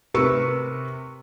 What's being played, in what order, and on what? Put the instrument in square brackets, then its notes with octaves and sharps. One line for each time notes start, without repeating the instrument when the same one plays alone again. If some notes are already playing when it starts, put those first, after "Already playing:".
[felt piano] C3 A#4 B4 C#6 E6 C#7